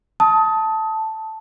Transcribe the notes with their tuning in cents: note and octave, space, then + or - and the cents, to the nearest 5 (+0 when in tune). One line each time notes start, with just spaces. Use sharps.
A5 +0 D#6 +25